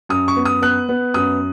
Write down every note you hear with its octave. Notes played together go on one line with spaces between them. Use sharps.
F#2 D#6
C#6
B3
D#6
B3 F#6
B3
F#2 D#6